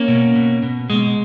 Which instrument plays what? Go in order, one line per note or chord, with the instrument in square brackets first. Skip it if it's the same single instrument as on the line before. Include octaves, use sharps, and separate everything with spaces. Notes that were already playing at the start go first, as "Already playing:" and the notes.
Already playing: [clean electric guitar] A#3 C#4
B2
B2
B2
B2 G#3